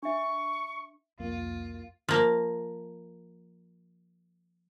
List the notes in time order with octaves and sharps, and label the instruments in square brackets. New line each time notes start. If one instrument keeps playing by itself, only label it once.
[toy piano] D4 E5 [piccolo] C#6
[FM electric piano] C2 F2 A#3 [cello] F4
[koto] F3 A#3